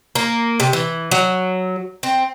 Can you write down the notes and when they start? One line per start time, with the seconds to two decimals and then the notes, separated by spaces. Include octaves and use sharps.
0.15 A#3
0.60 C3
0.73 E3
1.11 F#3
2.03 C4